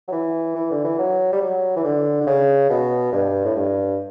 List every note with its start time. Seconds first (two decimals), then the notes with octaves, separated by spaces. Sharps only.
0.08 F#3
0.12 E3
0.56 E3
0.71 D3
0.85 E3
0.99 F#3
1.33 G3
1.42 F#3
1.76 E3
1.84 D3
2.21 D3
2.27 C#3
2.70 B2
3.13 G2
3.45 A2
3.56 G2